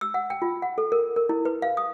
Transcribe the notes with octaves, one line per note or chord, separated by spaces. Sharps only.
E6
F#5
G5
F4
F#5
A4
A#4
A#4
E4
B4
F5
D#6